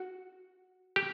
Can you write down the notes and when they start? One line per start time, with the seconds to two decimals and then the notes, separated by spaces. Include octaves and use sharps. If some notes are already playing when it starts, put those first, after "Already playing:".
Already playing: F#4
0.96 G4